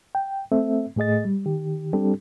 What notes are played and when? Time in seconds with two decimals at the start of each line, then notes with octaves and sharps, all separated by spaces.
0.15 G5
0.52 A3 C4 A4 E5
0.96 A2 A3 G#4 D#5 A6
1.25 G3
1.46 D#3 G4
1.93 G3 C4 D4 G4 A4